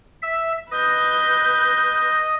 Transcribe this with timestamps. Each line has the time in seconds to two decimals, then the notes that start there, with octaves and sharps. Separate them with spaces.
0.22 E5
0.71 B4 D#5 G6